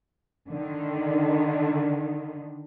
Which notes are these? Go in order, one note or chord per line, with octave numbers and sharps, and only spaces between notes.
D3 D#3